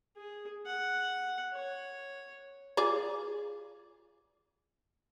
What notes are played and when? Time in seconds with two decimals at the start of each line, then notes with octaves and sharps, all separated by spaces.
0.17 G#4
0.66 F#5
1.53 C#5
2.77 F4 G#4 D5